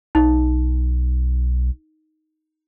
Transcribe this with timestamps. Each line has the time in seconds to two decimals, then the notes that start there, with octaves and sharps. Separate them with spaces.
0.15 B1 D#4